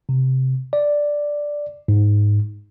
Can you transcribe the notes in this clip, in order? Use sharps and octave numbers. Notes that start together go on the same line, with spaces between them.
C3
D5
G#2